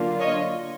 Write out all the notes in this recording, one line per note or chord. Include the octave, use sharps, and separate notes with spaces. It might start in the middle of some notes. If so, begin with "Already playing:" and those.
Already playing: D3 F#3 A#3 D4 F4
C#5 D#5